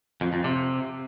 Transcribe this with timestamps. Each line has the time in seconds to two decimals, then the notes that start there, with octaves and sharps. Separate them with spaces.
0.21 F2
0.33 F2
0.44 C3